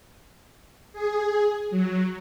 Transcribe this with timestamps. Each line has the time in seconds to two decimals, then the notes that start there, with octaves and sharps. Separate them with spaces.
0.93 G#4
1.70 F#3